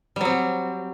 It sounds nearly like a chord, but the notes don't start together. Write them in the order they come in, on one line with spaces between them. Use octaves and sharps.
G3 F#3 C4